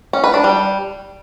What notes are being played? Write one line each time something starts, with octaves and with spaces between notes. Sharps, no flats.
C#4
B4
D4
G3